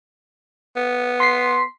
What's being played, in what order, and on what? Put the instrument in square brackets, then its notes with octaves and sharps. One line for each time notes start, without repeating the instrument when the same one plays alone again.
[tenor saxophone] B3
[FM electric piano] C6 B6 C7